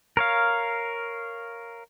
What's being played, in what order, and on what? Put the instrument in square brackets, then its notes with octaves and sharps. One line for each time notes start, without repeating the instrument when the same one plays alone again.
[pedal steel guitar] A#4 C#5 F5